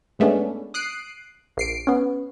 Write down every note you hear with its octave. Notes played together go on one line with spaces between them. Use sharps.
G2 G#3 A3 B3 C#4 D4
D#6 F#6 C7 D7
A#1 C7 D7
B3 C#4